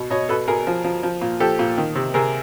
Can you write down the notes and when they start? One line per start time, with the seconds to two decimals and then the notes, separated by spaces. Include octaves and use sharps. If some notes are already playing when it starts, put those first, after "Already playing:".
Already playing: B2
0.10 B2 C#5 D#5
0.29 B2 A4 B4
0.48 B2 G#4 A#4
0.67 F3
0.84 F3
1.03 F3
1.21 A#2
1.40 F3 G4 A4
1.59 A#2
1.78 D#3
1.95 C3
2.14 C3 G#4 A#4